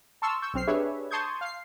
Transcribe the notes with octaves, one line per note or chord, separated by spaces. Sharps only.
A5 C6 C#6 E6 F6
C#6 E6 G6
B1 C4 F6 C7
D4 G4 G#4 B4 C#5 E5
A5 C6 C#6 D#6 G6 G#6
F5 C7